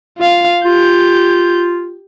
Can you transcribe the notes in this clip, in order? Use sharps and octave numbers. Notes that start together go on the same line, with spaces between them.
F4 F5
F4 G4 G6